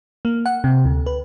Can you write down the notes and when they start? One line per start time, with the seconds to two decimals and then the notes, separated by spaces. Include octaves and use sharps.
0.25 A#3
0.46 F#5
0.64 C3
0.85 D2
1.06 B4